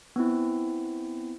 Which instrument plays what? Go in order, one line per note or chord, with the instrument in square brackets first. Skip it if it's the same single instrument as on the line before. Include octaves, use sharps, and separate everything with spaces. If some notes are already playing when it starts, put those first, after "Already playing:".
[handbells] B3 C4 E4